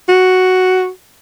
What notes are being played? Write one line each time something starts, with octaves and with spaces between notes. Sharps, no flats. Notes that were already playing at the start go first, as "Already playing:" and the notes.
F#4